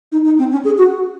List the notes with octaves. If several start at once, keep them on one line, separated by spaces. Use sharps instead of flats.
D#4
D#4
C4
C#4
G#4
F#4